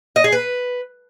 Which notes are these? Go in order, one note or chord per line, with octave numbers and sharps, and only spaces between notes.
D#5
G#4
B4